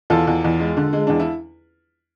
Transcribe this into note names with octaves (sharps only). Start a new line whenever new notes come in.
E2 F4 A4
E2
E2
G#3
D3
G#3
E2 D4
E4